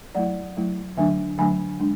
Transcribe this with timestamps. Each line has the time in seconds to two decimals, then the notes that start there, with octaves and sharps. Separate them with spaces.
0.15 F#3 A3 E4 D5 F#5
0.57 F#3 A3 E4
0.97 D3 F#3 A3 D4 E5 G#5
1.38 D3 F#3 A3 D4 G#5 B5
1.80 G#3 D4